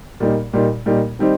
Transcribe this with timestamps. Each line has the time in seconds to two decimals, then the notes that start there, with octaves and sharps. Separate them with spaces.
0.20 A#2 G3 A#3 D#4
0.53 A#2 G3 A#3 D#4
0.86 A#2 G3 A#3 D#4
1.19 D#3 G3 C4 D#4